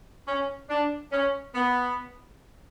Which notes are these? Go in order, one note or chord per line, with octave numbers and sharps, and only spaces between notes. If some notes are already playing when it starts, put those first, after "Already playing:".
C#4
D4
C#4
B3